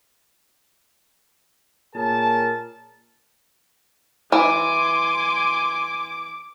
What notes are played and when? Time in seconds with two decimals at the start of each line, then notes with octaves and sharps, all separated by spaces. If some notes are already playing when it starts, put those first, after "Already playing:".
1.95 A#2 G#4 A#4 C#5 A5
4.32 E3 G#5 C6 D6